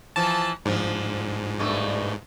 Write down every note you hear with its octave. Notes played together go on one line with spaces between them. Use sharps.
E3 F3 A5
G#2 F3 D4
G2 B2 A3